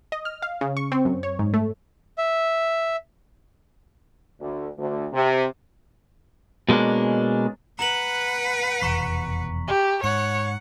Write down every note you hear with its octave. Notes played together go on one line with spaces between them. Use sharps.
D#5
F6
F5
C#3
C#6
C4
F#2
C#5
G#2
A3
E5
D2
D2
C3
B2 G#3 A#3 C#4 D4
B4 F#5 A#5 F#7
F1 E2 B2 A#5 C#6 B6
G4
G#2 C#5 F#5 C#7